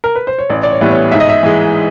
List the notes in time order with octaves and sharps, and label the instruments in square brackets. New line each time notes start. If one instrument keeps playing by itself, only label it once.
[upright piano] A#4
B4
C5
C#5
A1 D5
D5
C#5
A2 E3 G3 B3
C#5
G#2 E5
D#5
E5
E3 G#3